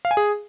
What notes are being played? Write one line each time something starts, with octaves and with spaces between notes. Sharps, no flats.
F5
G#5
G#4